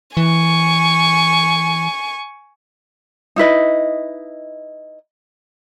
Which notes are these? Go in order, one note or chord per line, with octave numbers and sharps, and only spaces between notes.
E3 G#5 C#6
D#4 E4 B4 D#5